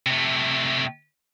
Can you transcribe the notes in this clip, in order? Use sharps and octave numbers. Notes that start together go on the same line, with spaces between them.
C3 A3